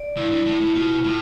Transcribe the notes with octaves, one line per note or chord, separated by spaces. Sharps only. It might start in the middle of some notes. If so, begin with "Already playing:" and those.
Already playing: D5
G2 E4
G2
A2 E4
A2
B2 F4
A2 F4